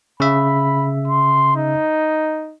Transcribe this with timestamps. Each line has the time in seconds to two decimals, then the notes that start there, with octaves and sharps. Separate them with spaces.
0.20 C#3 E5 B5
1.08 C6
1.56 D#4